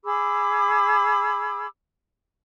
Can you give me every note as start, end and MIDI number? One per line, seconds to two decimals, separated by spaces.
0.05 1.66 68
0.05 1.66 83
0.05 1.66 86
0.05 1.66 88